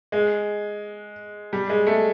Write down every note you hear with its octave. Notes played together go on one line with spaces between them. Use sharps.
G#3
G3
G#3
A3